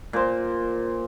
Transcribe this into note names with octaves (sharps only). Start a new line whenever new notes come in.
A#2 C5